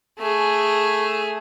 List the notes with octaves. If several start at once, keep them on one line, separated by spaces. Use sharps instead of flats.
A3 G#4